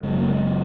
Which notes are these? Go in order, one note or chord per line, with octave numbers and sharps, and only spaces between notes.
F#1 F#2 C#3 G#3
A#3
G#3